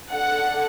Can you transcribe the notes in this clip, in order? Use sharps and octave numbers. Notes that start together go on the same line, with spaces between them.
D4 A4 F#5